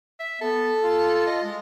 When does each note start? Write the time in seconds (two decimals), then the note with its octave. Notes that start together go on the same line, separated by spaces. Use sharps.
0.19 E5
0.41 B3 A4
0.84 F4
1.27 D#5
1.43 G#3